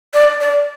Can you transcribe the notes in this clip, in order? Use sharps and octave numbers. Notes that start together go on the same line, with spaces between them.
D5
D5